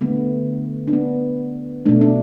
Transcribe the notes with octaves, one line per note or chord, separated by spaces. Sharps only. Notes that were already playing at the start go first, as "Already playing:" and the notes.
D3 A3 B3
D4
B3
B2 A3 D4
D4